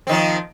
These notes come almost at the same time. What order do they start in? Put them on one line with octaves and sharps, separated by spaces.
C4 D#3 F3